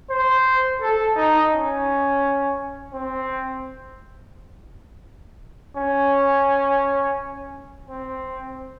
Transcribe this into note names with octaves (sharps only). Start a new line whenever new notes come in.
C5
A4
D#4
C#4
C4
C#4
C4